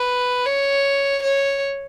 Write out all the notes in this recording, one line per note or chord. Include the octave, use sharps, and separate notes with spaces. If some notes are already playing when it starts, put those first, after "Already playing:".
Already playing: B4
C#5
C#5